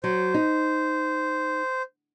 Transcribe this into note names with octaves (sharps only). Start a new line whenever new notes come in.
F#3 C5
D#4